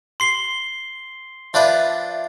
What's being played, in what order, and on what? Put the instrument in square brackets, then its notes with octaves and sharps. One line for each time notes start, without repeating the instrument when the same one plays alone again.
[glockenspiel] C6 C7 G7
[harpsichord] F3 D4 B4 [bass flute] E5